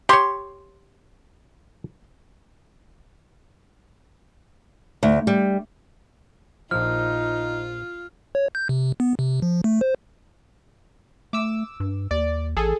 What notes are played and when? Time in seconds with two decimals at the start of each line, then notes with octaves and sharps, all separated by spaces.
0.09 G4 C#5 C6
5.03 D2
5.27 G3
6.71 A#1 F3 D#4 F4 F6
8.35 C#5
8.55 G6
8.69 C3
9.00 B3
9.19 C3
9.42 F3
9.64 A3
9.81 C5
11.33 A3 D6 E6
11.80 G2
12.11 D#2 D5
12.57 A1 G#4 A4